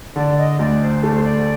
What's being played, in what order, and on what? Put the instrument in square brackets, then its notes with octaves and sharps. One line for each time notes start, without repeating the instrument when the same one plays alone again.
[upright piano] D3 [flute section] D5
[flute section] D#5
[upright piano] D2 [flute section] D5
[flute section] C5
[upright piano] A3 [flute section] D5
[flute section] C5
D5